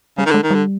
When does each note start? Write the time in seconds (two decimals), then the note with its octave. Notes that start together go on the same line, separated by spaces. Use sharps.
0.18 C#3 G3
0.26 D#3
0.30 D3
0.34 G#3
0.43 D#3
0.51 D3 G3